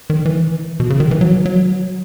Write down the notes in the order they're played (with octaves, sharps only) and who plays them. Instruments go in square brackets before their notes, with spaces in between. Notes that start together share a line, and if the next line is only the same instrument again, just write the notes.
[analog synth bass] D#3
E3
B2
C#3
D#3
E3
F#3
F#3